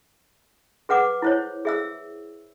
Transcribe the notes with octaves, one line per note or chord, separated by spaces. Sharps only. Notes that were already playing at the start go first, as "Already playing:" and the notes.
G#4 B4 F#5 D6
E4 C5 C#5
G#4 E5 E6